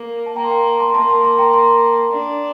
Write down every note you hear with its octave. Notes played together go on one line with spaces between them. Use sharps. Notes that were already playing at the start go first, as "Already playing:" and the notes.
Already playing: A#3
A5
A#3 G5 A#5
C6
G5 A#5
A5 C6
A#3 A5 C6
A5 C6
A5 C6
G5 A#5
A5 C6
D4